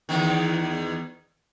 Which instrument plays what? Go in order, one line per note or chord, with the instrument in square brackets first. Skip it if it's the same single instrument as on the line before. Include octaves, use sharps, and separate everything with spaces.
[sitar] E2 D#3